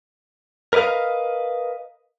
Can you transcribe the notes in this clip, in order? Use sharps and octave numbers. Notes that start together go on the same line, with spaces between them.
A#4 B4 D5 D#5 F5